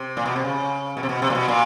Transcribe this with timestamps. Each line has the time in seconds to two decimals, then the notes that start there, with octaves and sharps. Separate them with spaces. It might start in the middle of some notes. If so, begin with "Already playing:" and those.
Already playing: C3
0.17 A#2
0.26 B2
0.36 C3
0.45 C#3
0.97 B2
1.03 C3
1.09 B2
1.22 C3
1.30 A#2
1.35 B2
1.48 A#2